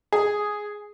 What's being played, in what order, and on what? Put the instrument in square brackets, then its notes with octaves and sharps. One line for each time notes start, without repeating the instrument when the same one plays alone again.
[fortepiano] G#4